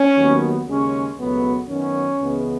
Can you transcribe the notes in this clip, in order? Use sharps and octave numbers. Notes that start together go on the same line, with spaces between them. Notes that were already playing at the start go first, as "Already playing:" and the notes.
Already playing: C#4
D#2 D#3 F#3 B3
D#2 C#3 G#3 C#4
C#2 B2 F#3 A3 B3
F#2 D#3 F#3 B3 C#4
C#2 C#3 E3 G#3 B3